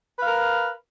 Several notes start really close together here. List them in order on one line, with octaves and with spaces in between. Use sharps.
B4 F5 A#4